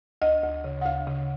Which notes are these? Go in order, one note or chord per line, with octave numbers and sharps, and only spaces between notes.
D2 D#5
D2
C#3
F#5
D2 F5
C#3